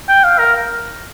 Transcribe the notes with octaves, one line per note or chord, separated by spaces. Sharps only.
G5
F5
A#4